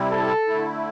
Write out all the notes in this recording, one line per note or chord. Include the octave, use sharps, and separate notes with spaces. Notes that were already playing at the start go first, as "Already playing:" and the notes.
Already playing: C3 G3 C4 E4
A4
D3 A3 E4